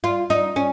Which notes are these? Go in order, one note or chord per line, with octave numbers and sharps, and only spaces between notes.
F4
D#4
C#4